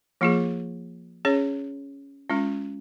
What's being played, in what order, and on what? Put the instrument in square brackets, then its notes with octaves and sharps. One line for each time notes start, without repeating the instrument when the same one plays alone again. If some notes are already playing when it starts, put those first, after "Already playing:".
[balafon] F3 A#3 F4 G#4
C#4 G#4 C#5
G#3 C#4 F4